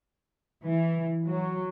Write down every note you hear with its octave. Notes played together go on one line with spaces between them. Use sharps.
E3
F#3